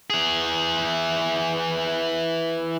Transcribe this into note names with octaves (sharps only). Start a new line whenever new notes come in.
E3 G#4